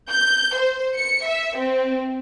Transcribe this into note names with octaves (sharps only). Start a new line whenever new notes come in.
G6
C5
C#7
E5
C4